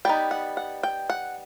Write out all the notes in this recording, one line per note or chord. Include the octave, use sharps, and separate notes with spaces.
G3 B3 D#4 G5
F#5
F#5
G5
F#5